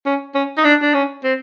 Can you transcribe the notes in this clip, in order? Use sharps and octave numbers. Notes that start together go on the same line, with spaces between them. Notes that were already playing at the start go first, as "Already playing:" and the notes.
C#4
C#4
D#4
D4
D4
C#4
C4